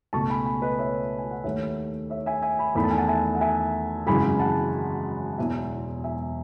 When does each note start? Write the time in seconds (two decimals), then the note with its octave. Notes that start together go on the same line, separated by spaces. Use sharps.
0.13 C#2 B2 A3 A5 C#6
0.30 G#5 B5
0.46 G#5 B5
0.62 B4 D#5
0.79 C#5 E5
1.18 G#5
1.31 F#5
1.44 D#2 D#3 A3 C#5 E5
2.10 C#5 E5
2.26 E5 G#5
2.42 E5 G#5
2.59 G#5 B5
2.75 E2 D#3 A3 B5
2.84 A5
2.91 G#5
2.98 F#5 A5
3.08 E5 G#5
3.35 F#5
3.41 E5 G#5
4.06 G#1 F#2 C#3 E3 G#3 G#5 B5
4.39 F#5 A5
5.38 E1 E2 B2 E5 G#5
6.04 E5 G#5